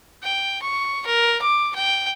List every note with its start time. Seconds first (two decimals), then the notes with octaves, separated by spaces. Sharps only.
0.23 G5
0.62 C#6
1.06 A#4
1.42 D6
1.75 G5